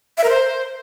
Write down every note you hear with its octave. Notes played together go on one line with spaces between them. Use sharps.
E5
A#4
C5